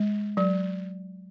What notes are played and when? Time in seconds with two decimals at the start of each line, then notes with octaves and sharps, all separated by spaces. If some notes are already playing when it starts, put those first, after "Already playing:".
Already playing: G#3
0.37 F#3